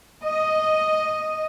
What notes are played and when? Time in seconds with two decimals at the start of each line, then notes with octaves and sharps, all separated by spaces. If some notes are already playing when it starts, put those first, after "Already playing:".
0.25 D#5